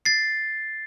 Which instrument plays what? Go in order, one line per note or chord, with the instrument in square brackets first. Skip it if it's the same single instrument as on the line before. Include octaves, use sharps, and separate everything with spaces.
[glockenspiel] A6 C7